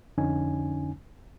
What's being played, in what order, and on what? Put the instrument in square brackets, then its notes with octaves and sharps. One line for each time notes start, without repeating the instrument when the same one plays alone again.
[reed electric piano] F2 D3 C#4 D#4 G#5